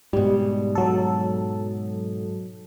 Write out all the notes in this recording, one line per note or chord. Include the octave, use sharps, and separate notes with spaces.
G#2 B2 G3
F#3 A4